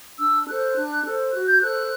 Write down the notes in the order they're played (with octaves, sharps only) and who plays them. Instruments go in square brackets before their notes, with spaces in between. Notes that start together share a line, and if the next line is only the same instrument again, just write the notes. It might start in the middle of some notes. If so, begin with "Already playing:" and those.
[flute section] D4 E6
A4 C5 F#6
D4
A4 C5
F#4 F#6
G6
A4 C5 F#6